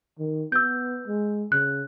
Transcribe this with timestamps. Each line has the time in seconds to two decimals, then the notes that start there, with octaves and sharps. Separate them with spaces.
0.19 D#3
0.52 B3 E6 G6
1.07 G#3
1.52 C#3 F#6